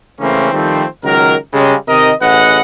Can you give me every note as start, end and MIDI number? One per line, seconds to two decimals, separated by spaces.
0.20 0.52 49
0.20 0.52 52
0.20 0.52 57
0.20 0.52 58
0.20 0.52 60
0.20 0.52 61
0.53 0.85 51
0.53 0.85 53
0.53 0.85 55
0.53 0.85 57
0.53 0.85 60
1.03 1.35 37
1.03 1.35 51
1.03 1.35 54
1.03 1.35 70
1.53 1.74 49
1.53 1.74 55
1.53 1.74 56
1.88 2.12 48
1.88 2.12 51
1.88 2.12 70
1.88 2.12 75
2.21 2.61 33
2.21 2.61 68
2.21 2.61 71
2.21 2.61 75
2.21 2.61 78